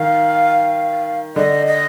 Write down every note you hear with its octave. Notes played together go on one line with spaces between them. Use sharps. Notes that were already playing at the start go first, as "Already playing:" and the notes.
Already playing: D#3 F5
D3 D#5
D#5